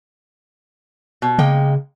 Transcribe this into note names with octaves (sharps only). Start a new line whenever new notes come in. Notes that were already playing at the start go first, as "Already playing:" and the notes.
B2
C#3 G#3 A#3 G5